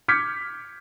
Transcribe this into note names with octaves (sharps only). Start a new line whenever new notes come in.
D6 F6 G6 G#6 B6 C#7